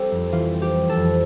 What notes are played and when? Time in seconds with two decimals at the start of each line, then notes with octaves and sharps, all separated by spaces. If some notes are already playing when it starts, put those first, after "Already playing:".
Already playing: G3 C4 G4 A4
0.11 F2
0.32 E3 F4
0.54 C4
0.62 G4
0.75 G3
0.89 A4
0.97 F2